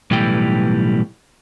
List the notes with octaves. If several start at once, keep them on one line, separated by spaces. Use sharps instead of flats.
B1 A2 E3 G3 G5